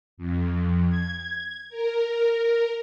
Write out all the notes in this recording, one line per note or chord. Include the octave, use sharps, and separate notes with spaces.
F2
G#6
A#4